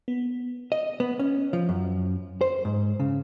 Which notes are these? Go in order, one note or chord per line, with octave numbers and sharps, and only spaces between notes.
B3
D#5
B3
C#4
F3
F#2
C5
G#2
C#3